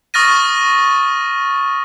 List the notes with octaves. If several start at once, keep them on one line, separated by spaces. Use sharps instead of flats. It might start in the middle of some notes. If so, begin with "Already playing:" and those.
C#6 D#6 F6 A6 A#6 D#7